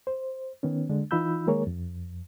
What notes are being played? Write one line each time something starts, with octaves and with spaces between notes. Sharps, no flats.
C5
D#3 B3 C#4
D3 G#3 D4
E3 D#4 F4 B5 E6 G6
D#3 G#3 A#3 G#4 A#4 C#5
F2